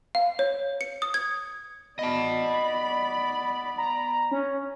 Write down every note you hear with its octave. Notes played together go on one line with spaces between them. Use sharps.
F5
C#5
C#7
D#6
G#6
B3 D5 D#5 A5 B5
A#5
C#4